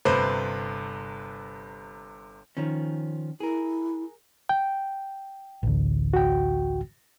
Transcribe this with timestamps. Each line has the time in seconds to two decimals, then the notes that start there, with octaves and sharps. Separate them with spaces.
0.05 G1 C3 B4 C5
2.57 D#3 F3 C#4
3.40 E4 G#4 A#4
4.49 G5
5.63 A1 D2
6.13 F#4 G5